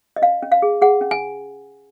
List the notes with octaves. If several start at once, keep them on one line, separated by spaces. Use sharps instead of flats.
D#5
C#4 F5
C#4
F5
G#4
G#4 F#5
C#4
G#5